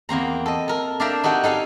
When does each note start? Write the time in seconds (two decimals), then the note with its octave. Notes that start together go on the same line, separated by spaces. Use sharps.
0.09 E2 A#3 C4 A#5
0.46 A4 D#5
0.68 A4 A#4
1.00 D4 D5 E5 F5 G5 A#5
1.24 D#4 F#4 G4 A4 G5
1.44 D#4 A4 F5 G#5